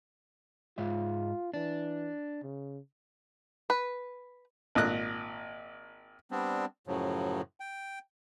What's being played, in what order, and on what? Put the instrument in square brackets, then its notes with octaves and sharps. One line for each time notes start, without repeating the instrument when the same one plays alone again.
[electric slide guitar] G#2 G#3 E5 [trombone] F4
[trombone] E3 [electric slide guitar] D4
[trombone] C#3
[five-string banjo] B4
[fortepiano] G#1 A#2 D#5 F#6
[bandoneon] G3 B3 C4 D4
F#2 A2 C#3 F3 F#3
G5